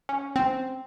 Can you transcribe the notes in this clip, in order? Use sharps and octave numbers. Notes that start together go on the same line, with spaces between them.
C#4
C4